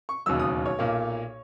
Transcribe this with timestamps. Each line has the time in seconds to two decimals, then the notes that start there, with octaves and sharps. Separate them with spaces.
0.09 C#6
0.26 E1 D#2 C#3 F#3 E6
0.40 D#6
0.66 C#5
0.79 B1 A#2 A#3